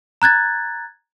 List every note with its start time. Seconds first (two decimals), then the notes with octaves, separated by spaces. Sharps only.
0.22 A#5 F#6 G#6 A6